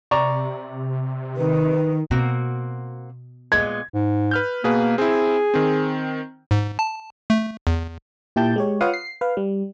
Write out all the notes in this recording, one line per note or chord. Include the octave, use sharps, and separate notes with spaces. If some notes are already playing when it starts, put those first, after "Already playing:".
C3 D5 A#5 C#6
D#3 B4
B2 A#3 C4 F#4
A#2 G#3 B3 G#6
G#2
B4 F6 G6
B2 A#3 G#4 B4
C4 E4 G#4
D#3 C4
G#2
A5
A3
E2
A#2 E4 G4 G5 A5 G6
G#3 G4 C#5
F4 B4 C#5 F5 F#5 D#6
C7
B4 F5
G3